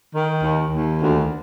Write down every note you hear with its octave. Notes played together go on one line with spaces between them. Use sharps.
D#3
D#2
D#2
D2